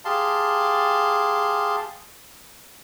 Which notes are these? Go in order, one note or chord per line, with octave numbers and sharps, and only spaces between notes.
G4 G#4 F5 A5 C6